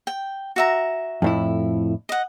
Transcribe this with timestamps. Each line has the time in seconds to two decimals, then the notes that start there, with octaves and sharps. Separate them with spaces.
0.07 G5
0.56 F#4 E5 A#5
1.22 F2 A2 E4
2.09 D#5 F#5